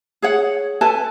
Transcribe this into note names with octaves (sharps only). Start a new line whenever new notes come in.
G#4 C#5 F#5
A4 B4 G#5 A5